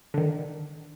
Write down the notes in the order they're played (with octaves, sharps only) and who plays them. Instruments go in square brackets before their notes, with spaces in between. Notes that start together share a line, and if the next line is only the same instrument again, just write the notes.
[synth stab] D3 D#3